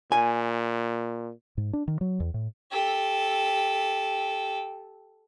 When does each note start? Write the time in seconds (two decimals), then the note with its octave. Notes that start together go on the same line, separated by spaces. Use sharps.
0.12 A#2 G#5
1.57 G#2
1.73 D4
1.88 D#3
2.01 F#3
2.20 E2
2.34 A2
2.71 G4 A4